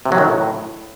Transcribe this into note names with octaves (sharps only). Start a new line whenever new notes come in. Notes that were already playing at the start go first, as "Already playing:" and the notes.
C3
F#3
D#3
A2